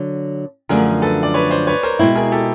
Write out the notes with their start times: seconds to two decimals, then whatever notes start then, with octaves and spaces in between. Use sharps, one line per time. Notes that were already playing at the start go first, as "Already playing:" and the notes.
Already playing: D3 F#3
0.69 F#2 D3 F3 A3 D4 G#4 A#4
1.02 A4 B4
1.23 D5
1.34 B4 C#5
1.50 C5 D5
1.67 B4 C#5
1.83 A#4 C5
1.99 B2 G#3 C4 E4
2.16 G#4 A#4
2.32 G4 A4